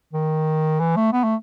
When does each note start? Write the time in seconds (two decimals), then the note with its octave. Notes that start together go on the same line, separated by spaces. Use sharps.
0.13 D#3
0.80 E3
0.96 A3
1.13 B3
1.24 A3